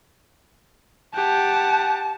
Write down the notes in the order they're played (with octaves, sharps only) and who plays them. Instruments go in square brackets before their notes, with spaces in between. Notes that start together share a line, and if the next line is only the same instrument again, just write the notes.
[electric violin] G4 F#5 [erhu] A5